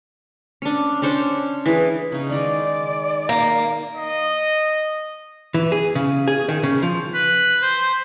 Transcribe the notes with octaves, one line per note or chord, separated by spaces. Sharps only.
C#4 D4
C#4 D4 C5 C#5
E3 G#4
C#3 D#4
D#3 G#3 D#4 D5
A#3
D#5
E3
G#4
C#3
G#4
D#3
C#3
F3
B4
C5